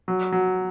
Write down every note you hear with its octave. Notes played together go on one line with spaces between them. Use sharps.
F#3
F#3